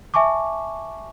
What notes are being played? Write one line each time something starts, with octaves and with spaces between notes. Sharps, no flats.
E5 G#5 A5 C#6 D6